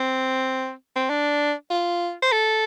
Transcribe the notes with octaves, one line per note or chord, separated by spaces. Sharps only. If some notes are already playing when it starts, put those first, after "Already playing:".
Already playing: C4
C4
D4
F4
C5
A4